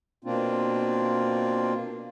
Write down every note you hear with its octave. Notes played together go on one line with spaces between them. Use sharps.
B2 A#3 C4 D4 F4